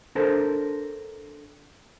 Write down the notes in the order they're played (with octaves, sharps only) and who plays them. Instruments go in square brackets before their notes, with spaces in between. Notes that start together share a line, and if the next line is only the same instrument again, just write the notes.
[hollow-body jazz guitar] D4 A4 A#4 C5 A5 A#5